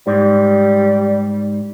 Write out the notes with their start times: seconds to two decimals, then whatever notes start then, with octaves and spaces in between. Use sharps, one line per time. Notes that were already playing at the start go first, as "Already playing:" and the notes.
0.07 G#2 G3